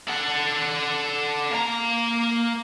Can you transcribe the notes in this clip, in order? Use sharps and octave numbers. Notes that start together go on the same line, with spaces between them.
A4 F#5
A#3 A#5